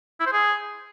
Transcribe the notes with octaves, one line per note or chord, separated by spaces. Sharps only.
E4
C5
G#4